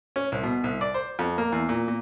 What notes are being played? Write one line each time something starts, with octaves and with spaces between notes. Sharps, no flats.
C#4
C2
B2
C2
D5
C5
F2
A#3
E2
A#2
A#2